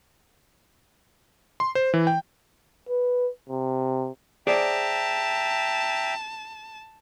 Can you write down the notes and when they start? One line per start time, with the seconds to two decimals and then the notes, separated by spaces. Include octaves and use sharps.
1.60 C6
1.75 C5
1.94 E3
2.07 G5
2.89 B4
3.49 C3
4.47 G#4 C5 D5 E5 G5 A5 A#5